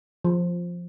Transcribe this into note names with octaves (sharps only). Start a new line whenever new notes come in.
F3